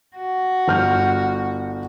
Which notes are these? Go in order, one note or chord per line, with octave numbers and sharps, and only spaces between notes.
F#4
G1 F6 G6